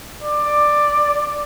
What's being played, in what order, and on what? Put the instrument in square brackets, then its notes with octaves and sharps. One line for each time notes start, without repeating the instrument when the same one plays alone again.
[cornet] D5